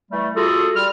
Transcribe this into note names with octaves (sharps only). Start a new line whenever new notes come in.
E3 G3 A3
A3 F4 F#4 G#4 A4
G3 F6